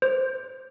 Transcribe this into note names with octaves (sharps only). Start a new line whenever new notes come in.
C5